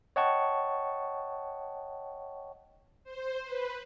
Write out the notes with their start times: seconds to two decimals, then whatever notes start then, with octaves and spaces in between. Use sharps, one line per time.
0.16 C#5 D#5 F#5 G5 A5 C#6
3.04 C5
3.44 B4